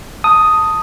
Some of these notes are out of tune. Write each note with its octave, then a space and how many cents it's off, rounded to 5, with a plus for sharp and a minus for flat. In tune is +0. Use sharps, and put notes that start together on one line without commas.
A5 +20 D#6 +5